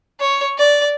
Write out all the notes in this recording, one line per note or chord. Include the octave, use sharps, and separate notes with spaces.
C#5
D5